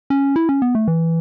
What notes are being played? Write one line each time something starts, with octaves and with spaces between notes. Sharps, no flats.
C#4
E4
C#4
B3
A3
E3